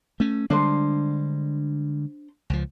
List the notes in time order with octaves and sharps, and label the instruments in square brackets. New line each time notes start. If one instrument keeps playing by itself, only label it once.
[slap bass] A3 C#4
[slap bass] D3 G3 G#3 [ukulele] D4 C5
[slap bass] C#2 F3